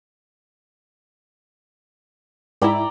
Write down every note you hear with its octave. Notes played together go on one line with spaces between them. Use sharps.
G#2 E4 D5 G5 A#5